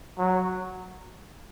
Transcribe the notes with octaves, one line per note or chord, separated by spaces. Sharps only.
F#3